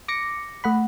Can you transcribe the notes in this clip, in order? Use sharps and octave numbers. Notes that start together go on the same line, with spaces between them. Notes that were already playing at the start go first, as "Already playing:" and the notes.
D6 A#6 C#7
A3 F#5 B5